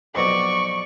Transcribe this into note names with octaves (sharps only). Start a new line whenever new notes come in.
F2 B2 F#3 D5 C#6